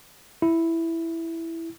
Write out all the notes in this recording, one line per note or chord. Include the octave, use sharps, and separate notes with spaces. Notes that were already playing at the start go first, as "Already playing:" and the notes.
E4